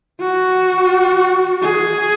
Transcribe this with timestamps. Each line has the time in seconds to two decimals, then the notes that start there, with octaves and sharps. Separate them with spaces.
0.21 F#4
1.62 G#4